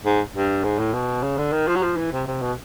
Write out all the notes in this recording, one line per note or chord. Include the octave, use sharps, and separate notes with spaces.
G#2
G2
G#2
A2
B2
C#3
D3
D#3
F3
F#3
F3
E3
C3
C3
B2